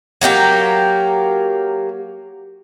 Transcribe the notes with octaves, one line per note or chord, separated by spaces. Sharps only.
F#3 A#3 D#4 G4